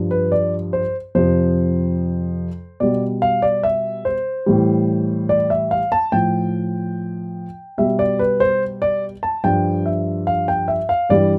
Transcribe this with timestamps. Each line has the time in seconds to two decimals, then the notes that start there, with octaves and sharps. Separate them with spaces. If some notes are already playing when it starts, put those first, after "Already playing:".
Already playing: G2 F3
0.11 B4
0.32 D5
0.73 C5
1.15 F2 C3 F3 C5
2.80 B2 G3 D5
3.22 F5
3.42 D5
3.63 E5
4.05 C5
4.46 A2 E3 G3
5.29 D5
5.50 E5
5.71 F5
5.92 A5
6.12 A2 F3 G5
7.78 B2 G3 E5
7.99 D5
8.19 B4
8.40 C5
8.82 D5
9.23 A5
9.44 G2 F3 G5
9.86 E5
10.27 F5
10.48 G5
10.68 E5
10.89 F5
11.10 G2 E3 G3 D5